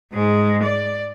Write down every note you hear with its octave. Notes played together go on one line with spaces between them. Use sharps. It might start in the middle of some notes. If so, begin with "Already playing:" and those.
G#2 G#3
D5